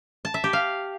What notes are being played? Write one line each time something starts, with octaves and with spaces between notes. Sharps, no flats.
A5
E5
G4
F5